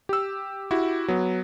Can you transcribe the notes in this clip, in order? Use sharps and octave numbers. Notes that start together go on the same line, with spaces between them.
G4 E6
E4 F#4 G4
F#3 B3